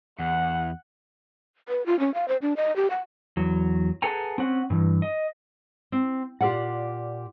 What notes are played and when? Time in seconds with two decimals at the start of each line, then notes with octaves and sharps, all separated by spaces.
0.19 E2 F#5
1.69 B4
1.86 F4
1.99 C#4
2.14 F5
2.28 C5
2.42 D4
2.57 D#5
2.76 G4
2.90 F#5
3.37 E2 F#3
4.02 G#4 A4 B4 F#5 G#5 A#5
4.38 C4 C#4 F#5
4.70 G2 E3
5.02 D#5
5.92 C4
6.41 A#2 F4 G4 A#4 D5 F#5